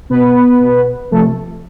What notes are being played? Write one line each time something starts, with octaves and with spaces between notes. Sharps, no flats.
B2 B3 B4
B2
C3 F3 A3 A4